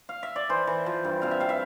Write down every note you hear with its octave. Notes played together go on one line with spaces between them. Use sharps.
F5
E5
D5
E3 C5
E3
F3
G2
C3 F5
E5
C3 F5
E5